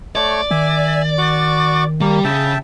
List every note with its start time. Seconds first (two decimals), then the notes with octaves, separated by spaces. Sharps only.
0.15 A3 C#5 D5 C#6
0.51 D#3 E5 G#5
1.18 F#4 C#6
2.01 G3 A#3
2.24 C#3 E5 G5 A5